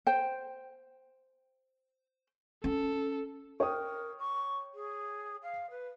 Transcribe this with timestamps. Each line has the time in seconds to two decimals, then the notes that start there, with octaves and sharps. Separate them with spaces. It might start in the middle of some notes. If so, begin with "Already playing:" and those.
0.07 C5 G5
2.64 C#4 A4
3.60 A#4 C#5 G5 D#6
4.19 C#6
4.74 G#4
5.42 F5
5.70 B4